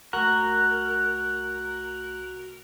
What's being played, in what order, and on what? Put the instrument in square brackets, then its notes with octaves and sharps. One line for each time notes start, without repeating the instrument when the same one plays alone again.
[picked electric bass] C2 A3 [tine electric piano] F#4 [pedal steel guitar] A#4 [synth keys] F#6